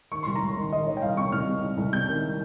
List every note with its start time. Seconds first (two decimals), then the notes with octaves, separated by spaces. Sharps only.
0.11 D#3 C#6
0.23 C2 C6
0.35 A#5
0.42 C2
0.48 C6
0.57 D#3
0.72 D#3 D#5
0.86 D#3 C#5
0.97 G5
1.02 C2 F5
1.17 C3 C#6
1.32 C2 F6
1.48 C3
1.63 C2
1.78 C2
1.92 C3 G6
2.09 D#3